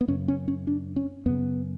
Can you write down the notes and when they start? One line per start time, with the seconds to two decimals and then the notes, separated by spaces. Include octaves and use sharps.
0.01 B3
0.08 F#2 C#3 C#4
0.28 C#4
0.48 C#4
0.67 D4
0.96 C#4
1.26 F#2 C#3 B3